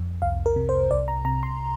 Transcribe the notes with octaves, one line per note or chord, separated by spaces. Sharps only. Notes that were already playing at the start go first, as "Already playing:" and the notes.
Already playing: F2
C2 F5
A#4
C3
C5
C2 D5
A#5
C3 A#5
C6